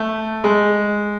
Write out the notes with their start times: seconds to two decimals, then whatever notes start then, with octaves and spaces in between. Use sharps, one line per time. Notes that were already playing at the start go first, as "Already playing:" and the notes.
Already playing: A3
0.44 G#3